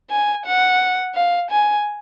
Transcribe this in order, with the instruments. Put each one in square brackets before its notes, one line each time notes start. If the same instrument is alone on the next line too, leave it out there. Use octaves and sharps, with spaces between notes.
[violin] G#5
F#5
F5
G#5